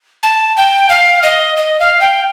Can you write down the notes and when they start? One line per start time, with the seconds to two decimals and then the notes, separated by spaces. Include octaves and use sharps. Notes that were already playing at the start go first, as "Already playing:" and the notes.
0.23 A5
0.57 G5
0.89 F5
1.23 D#5
1.57 D#5
1.79 F5
2.01 G5